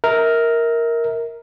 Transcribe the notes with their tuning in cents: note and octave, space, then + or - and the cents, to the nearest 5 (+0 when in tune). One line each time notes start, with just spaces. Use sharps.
A#4 +0 E5 -35